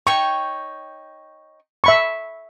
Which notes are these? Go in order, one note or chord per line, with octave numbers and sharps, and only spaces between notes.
D#4 C#5 G5 C#6
E5 B5 C#6